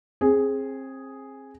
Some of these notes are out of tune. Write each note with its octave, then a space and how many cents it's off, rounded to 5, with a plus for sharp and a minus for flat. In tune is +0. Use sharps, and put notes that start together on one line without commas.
C4 +30 G#4 +0